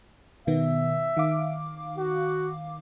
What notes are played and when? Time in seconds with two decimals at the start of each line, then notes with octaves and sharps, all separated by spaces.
0.47 B2 D#3 B3 E5
1.17 D#3 F5 D6
1.98 F#4